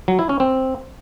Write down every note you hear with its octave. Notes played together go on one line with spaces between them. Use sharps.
F#3
E4
C#4
C4